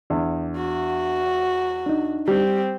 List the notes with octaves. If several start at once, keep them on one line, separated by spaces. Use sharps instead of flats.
E2 D4
F#4
D4 D#4
G3 C4